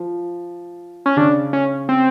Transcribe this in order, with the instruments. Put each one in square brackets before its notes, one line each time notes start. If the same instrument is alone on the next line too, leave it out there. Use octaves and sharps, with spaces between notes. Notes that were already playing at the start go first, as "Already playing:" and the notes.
Already playing: [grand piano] F3
[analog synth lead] C#4
[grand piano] C#3 [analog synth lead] D4
[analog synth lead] C#4
C4